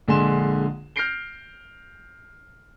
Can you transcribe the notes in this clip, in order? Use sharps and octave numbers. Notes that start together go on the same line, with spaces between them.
A#1 D3 G#3 G#5 C6 E7
F6 G6 A#6 C7 D7 G7